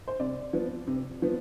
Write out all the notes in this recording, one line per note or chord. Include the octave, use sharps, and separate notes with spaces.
C5
C3 D5
F3 B3
C3
F3 B3